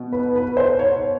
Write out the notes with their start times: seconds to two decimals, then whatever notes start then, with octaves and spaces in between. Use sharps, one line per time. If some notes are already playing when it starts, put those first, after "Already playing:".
Already playing: B2
0.12 B4
0.35 B4
0.57 C5
0.79 C#5